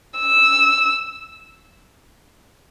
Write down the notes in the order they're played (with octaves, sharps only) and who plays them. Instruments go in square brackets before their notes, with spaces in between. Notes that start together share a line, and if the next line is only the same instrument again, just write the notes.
[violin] E6